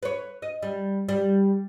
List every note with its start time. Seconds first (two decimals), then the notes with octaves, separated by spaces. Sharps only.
0.03 B4 C#5
0.42 D#5
0.62 G3
1.09 G3